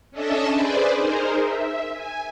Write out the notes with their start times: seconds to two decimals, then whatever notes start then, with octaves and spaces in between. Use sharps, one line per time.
0.11 C#4 D4 A4 D#5 E5 A5
0.52 G#4 B4 C5 D5
0.98 D#4 G#4 A#4 C5
1.40 E5
1.92 G#5